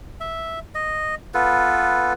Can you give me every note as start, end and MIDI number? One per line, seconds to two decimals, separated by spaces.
0.21 0.59 76
0.75 1.15 75
1.34 2.13 59
1.34 2.13 65
1.34 2.13 69
1.34 2.13 71